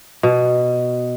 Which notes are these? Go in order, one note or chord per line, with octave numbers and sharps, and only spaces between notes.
B2